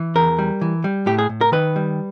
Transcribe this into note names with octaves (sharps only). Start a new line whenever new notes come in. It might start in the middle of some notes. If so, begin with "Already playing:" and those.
Already playing: E3
E2 A#4
G3
E3
G3
A2 G4
G#4
A2
A#4
D#3 B4
G3